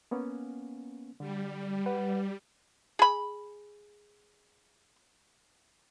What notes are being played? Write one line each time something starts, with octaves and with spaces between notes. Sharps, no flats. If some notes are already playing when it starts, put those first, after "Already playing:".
A#3 B3 C#4
D3 G3
B4 F#5
G#4 B5